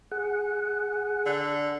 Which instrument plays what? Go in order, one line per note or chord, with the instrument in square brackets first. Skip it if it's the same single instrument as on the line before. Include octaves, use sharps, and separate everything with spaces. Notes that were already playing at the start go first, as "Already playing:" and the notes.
[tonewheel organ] G#4 F#5
[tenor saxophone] D3